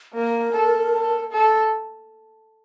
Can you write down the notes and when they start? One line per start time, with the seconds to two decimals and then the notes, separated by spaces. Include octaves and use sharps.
0.14 A#3 A#4
0.52 A4
0.92 A4
1.31 A4